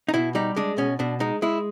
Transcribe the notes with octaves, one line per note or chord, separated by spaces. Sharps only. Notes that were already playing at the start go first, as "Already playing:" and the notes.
D#4
B2 E4
G3 D#4
G#3 D4
B2 C#4
B2 D4
G#3 D#4
G#3 E4